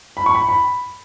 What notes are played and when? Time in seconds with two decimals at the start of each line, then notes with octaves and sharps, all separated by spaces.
0.17 B5
0.26 C#6
0.35 B5
0.49 B5